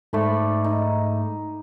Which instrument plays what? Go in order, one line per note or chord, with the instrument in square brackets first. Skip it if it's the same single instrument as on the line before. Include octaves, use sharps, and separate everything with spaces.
[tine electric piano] G#2 A3 [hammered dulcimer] D5 B5
[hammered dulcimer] D#4